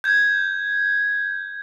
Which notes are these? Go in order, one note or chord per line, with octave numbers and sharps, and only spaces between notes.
G6 G#6